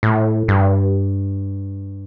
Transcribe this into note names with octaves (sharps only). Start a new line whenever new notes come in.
A2
G2